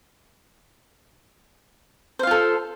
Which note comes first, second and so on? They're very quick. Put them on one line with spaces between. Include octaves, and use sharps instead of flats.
C5 F5 F4 A4